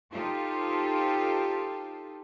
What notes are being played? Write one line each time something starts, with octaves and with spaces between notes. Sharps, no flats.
D#4 F4 G4 A4 C5